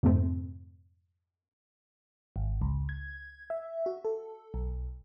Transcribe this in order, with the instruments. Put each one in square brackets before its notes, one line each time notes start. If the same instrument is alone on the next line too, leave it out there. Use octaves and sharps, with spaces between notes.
[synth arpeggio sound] F2 G#2 C3 A3 C4
[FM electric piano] G#1
C#2
G#6
E5
F#4
A4
B1